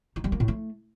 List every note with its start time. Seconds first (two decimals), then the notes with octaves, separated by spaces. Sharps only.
0.16 D#4
0.24 G3
0.32 A#3
0.40 A2
0.48 A3